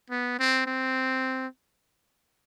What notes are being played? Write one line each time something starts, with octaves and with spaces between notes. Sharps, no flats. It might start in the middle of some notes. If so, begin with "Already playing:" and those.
B3
C4
C4